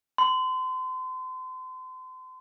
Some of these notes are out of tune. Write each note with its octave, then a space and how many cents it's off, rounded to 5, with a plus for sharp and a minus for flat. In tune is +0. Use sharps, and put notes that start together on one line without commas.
C6 -35